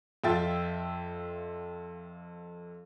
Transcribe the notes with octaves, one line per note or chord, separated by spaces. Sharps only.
F2 F4 E5 G5 A6